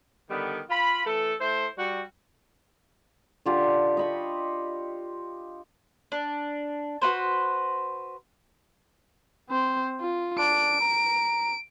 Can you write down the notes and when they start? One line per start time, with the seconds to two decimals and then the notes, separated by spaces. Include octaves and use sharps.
0.29 D3 D#3 G3 B3
0.70 F4 B5
1.06 E3 A3 A4
1.40 A3 E4 C5
1.77 G3 F#4
3.46 D3 F4 G4
3.97 D#5 B5 C#6
6.12 D4
7.02 F#4 B4 C5
9.50 C4 C5
10.00 F4
10.39 D4 D7
10.81 A#5